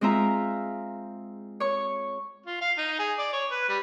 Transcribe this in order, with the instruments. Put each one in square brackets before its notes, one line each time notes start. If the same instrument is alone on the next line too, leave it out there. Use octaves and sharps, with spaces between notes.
[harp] G#3 C4 F4 E5 A#5
C#5 C#6
[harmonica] F4
F5
D#4
G#4
D5
C#5
B4
G3